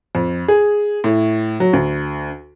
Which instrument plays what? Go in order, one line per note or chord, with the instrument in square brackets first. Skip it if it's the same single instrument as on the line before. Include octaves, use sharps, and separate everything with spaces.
[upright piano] F2
G#4
A2
F#3
D2